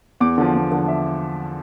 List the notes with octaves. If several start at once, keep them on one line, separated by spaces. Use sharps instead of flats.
E2 D6
D3 F3
E2
D3 F3
E5